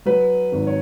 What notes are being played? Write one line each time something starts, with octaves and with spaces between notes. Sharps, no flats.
F#3 B4
G#1
C#5